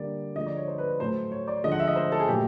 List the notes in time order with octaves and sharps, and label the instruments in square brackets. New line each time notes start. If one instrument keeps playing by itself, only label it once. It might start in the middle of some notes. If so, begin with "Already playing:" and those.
Already playing: [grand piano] D3 G3 A#3 D5
D3 F3 G#3 D#5
D5
C#5
C5
B4
B4
A2 F#3 A3 C5
C#5
D5
D3 F3 G#3 D#5
F#5
E5
D#5
C5
A4
G#4
A#2 F#3 A3 G4